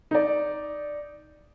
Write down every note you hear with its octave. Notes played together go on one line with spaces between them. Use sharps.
D#4 D5